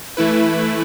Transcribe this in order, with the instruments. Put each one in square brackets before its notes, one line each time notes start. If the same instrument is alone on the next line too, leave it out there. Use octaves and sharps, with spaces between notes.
[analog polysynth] E3 A3 E4 B4